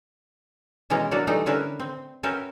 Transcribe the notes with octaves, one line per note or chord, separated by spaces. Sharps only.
B2 E3 G#3 C#4 A#5
F#3 D4 E4 F#4 A#4 D5
E3 G3 A3 D#4
D3 C#4 E4 A#4 B4 E5
C4
C#4 F#4 A#4 B4 E5 G5